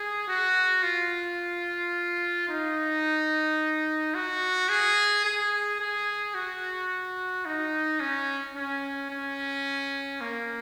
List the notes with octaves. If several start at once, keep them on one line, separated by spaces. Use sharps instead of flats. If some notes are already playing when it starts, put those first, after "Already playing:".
Already playing: G#4
F#4
F4
D#4
F#4
G#4
G#4
G#4
F#4
D#4
C#4
C#4
C#4
A#3